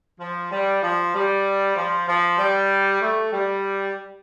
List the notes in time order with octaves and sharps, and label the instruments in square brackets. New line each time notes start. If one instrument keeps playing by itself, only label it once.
[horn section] F3
G3
F3
G3
F3
F3
G3
A3
G3